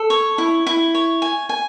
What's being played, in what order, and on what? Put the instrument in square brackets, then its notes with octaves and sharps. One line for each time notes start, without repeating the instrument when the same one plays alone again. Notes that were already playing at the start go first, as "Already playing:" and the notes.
Already playing: [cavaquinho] A4
C#5
E4
E4
C#5
G#5
G#5